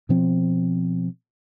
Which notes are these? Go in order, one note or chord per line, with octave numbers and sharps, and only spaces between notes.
B2 F3 C4